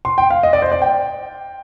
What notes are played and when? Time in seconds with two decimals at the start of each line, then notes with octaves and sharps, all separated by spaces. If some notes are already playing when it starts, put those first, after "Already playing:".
0.05 C6
0.18 G5
0.31 F5
0.43 D#5
0.53 D5
0.62 C5
0.72 D5
0.82 G5